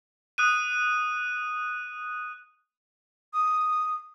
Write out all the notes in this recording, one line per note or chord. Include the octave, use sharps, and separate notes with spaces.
D#6 F#6 D#7
D#6